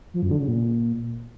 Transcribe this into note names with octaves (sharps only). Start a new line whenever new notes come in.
F3
F#2
D3
C#3
A#2